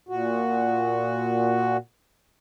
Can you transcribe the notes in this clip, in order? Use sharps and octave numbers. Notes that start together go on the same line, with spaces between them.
A#2 F#4